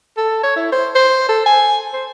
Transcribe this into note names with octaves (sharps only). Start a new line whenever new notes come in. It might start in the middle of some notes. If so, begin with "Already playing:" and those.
A4
C#5
E4
C5
C5
A4
G#5
C5